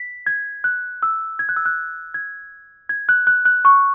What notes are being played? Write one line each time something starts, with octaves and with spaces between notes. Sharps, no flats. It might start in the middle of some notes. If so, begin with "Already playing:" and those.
Already playing: B6
G#6
F#6
E6
G#6
F#6
E6
F#6
G#6
G#6
F#6
F#6
F#6
C#6